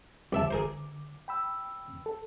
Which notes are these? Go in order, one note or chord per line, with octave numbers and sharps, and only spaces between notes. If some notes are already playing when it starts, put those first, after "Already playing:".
C2 D3 E5 A5 D6
G#4 A#4 C5
G5 B5 E6
A4